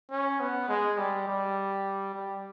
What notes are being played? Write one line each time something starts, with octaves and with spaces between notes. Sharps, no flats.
C#4
B3
G#3
G3
G3
G3